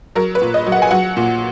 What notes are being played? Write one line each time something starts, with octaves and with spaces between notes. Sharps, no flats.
F#3 A#4
B4
A#2
D#5
F#3
F#5
G#5
F#3 F#5
A#2